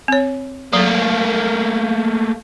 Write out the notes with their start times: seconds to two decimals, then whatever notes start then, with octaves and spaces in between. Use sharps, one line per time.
0.08 C4 C#5
0.73 F#3 A3 A#3